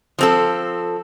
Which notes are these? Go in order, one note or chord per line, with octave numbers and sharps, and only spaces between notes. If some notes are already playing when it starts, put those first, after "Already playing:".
F3 C4 A4